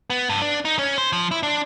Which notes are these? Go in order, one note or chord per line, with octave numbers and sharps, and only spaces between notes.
B3
G2
D4
D#4
C#4
C5
F3
E4
D4